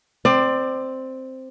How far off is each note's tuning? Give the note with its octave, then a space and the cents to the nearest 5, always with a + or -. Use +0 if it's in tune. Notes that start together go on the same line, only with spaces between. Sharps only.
C4 +0 D5 +25